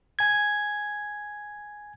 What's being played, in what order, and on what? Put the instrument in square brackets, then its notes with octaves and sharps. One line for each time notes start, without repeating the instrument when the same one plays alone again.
[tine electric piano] G#5 G#6